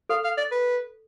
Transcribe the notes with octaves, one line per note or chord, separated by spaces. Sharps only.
A4 F5
F5
D5
B4